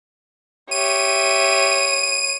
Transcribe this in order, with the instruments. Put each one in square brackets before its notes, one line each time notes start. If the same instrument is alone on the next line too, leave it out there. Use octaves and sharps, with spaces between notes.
[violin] G4 E5 [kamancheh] C#5 [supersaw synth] D#7